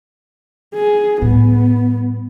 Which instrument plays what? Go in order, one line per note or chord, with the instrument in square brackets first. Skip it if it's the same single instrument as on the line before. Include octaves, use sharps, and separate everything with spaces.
[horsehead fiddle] G#4
[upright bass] A2 G3 [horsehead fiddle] B3